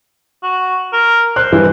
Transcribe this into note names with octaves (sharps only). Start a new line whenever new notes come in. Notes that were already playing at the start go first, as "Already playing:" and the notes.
F#4
A#4
C5 F#6
G2 E3